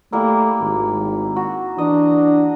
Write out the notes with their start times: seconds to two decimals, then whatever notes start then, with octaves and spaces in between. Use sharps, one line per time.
0.12 G3 A3 A#3 E4
0.61 G#1
1.36 F#4
1.78 E3 D4 D#5